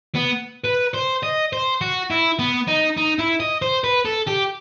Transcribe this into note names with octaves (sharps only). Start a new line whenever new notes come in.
B3
B4
C5
D#5
C5
F#4
E4
B3
D#4
D#4
E4
D#5
C5
B4
A4
G4